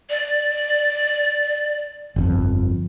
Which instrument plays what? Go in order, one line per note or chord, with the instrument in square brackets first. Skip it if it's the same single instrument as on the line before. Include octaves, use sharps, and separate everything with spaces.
[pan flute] D5
[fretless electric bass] G1 F2